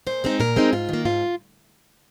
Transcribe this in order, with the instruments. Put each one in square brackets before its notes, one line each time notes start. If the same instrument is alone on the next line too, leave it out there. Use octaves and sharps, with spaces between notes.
[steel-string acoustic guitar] A#2 C5
G#3 C4 D#4
A#2 A#4
G#3 C4 D#4
G#2 F4
D#3 A#3
G#2 F4